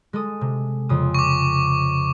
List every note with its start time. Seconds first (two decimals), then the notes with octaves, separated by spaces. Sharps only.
0.13 G#3 A4 D#6
0.41 C3
0.89 F2 C#3 D#6
1.15 C#6 D6